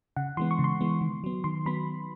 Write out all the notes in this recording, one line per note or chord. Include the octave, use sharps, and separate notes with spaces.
C#3 F#5
E3 G#3 B3 C6
C#6
C#3
C6
E3 G#3 B3
D#3
F#3 B3
D#3 C6
F#3 B3 B5